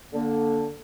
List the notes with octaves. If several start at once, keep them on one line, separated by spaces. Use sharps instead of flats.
D3 A#3